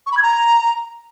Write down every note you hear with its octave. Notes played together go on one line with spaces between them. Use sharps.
C#6
B5
G#6
A#5